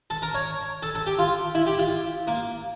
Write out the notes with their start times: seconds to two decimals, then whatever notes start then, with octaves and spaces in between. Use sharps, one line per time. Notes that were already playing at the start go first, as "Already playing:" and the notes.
0.10 A4
0.22 A#4
0.35 C#5
0.83 A4
0.95 A4
1.07 G4
1.19 F4
1.55 E4
1.67 G4
1.78 F4
2.27 A#3